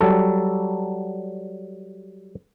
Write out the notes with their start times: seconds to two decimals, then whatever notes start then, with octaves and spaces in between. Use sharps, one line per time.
0.01 F#3 G3 A4